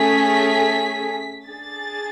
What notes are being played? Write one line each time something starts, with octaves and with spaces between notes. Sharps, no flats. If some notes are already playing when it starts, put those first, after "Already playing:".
Already playing: A3 C#4 G#4 B6
D4 G#4 A6